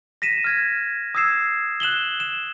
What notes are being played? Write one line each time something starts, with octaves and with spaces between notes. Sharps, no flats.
A#6 B6 D#7 E7
F6 G#6 A#6
D#6 E6 G#6 C7 E7
F#6 E7 F#7 G7
E7